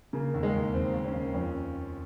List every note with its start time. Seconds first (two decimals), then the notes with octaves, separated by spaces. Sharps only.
0.13 C#3 A#3
0.34 D#2
0.43 G#3
0.54 D#2
0.73 D#2 C4
0.94 D#2
1.04 C#4
1.13 D#2
1.34 F2 C#4